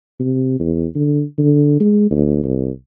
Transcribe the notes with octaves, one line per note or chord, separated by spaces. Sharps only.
C3
E2
D3
D3
G#3
D2
C2